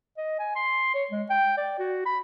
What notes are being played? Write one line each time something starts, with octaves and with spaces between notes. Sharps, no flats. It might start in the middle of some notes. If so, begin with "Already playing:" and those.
D#5
G#5
C6
C#5
G#3
G5
D5
F#4
B5